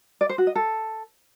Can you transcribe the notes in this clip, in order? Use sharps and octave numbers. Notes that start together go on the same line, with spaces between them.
D5
C5
F#4
D#5
A4